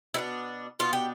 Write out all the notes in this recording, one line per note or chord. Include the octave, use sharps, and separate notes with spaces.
B2 B3 D4 E4
B2 B3 D4 F4
G4